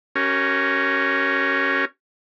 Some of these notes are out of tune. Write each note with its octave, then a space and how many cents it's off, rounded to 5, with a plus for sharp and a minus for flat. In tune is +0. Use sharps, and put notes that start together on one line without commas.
C#4 +0 G4 -45 A#4 +0